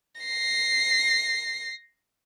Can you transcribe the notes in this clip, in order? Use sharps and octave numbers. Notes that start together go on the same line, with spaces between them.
A#6 C7